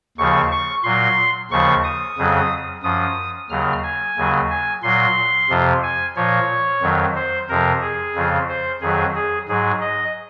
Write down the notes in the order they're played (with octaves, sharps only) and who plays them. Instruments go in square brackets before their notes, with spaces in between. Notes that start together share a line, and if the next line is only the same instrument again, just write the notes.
[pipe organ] D#2 C#3 F3 C#6
C#6
A#2 F#3 C6
D#2 C#3 F3 C#6
D#6
F2 C#3 F#3
F#2 F3 D#6
D#2 C#3 F#3 F6
G#5
D#2 C#3 F#3
G#5
A#2 F#3 C6
F2 C3 F3
G#5
A#2 F3 C#5
F2 D#3 F#3
C5
F2 C3 F3 A#4
G#4
F2 C#3 F3
C5
F2 D#3 F#3 G#4
G#4
G#2 F#3 G#4
D#5